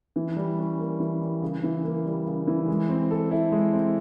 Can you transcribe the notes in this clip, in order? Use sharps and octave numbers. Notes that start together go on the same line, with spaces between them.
E3
G3
C#4
A#3
E3
G3
C#3
E3
A#3
G3
C#3
E3
G#3
C4
A4
E4
G#3
C4